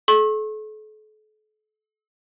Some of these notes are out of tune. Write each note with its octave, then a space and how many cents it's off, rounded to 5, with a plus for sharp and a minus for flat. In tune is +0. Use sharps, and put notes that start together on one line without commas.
A4 -40 C#6 -40